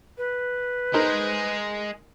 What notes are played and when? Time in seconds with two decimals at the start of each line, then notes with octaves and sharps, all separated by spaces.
0.18 B4
0.94 G#3 D#4 G#4 A#4 C5